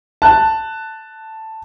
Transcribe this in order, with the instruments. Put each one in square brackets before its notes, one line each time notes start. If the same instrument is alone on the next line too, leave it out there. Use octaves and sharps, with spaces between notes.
[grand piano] A5 F#6